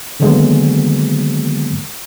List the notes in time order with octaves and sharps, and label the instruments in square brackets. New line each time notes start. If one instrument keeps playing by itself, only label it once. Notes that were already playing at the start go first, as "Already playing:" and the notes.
[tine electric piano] D3 D#3 F#3 G#3 A#3 B3